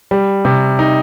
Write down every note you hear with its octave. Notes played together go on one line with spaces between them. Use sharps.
G3
C3
D#4